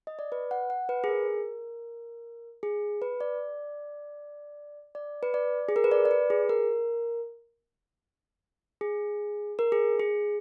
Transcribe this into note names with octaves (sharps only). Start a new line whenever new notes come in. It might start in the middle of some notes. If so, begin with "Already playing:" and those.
D#5
D5
B4
F#5
F#5
B4
G#4
A#4
G#4
B4
D5
D5
B4
D5
G#4
A#4
B4
D5
D5
B4
G#4
A#4
G#4
A#4
G#4
G#4